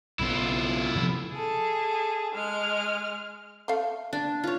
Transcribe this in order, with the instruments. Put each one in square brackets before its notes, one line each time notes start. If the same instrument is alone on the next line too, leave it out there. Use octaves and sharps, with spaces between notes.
[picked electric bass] B1 C#3 B3 [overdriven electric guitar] E4 F4
[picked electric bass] C3 F3
[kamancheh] G#4 A4
G#3 F6
[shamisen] A3 F5
[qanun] D4
F4 C#5